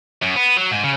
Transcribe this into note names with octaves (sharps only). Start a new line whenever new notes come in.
F#2
B3
F#3
G#2
C#3